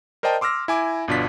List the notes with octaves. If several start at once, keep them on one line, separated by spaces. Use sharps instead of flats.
A#4 C5 D5 D#5 G5 A5
C6 D6 E6 F6 A#6
E4 G#5 D6
G1 B2 D4 F4 B6